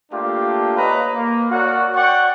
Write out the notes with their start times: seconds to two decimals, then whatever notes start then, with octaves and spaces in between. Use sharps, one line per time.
0.12 A3 A#3 D4 F4 G4
0.78 A#3 B4 C#5 D#5 A#5
1.14 A#3
1.51 F#4 A#4 C#5 D5 F#5
1.94 F#4 D5 F#5 G5 C#6